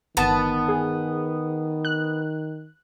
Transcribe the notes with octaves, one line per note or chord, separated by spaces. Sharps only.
G1 D#3 B3 A5
G#4
F#6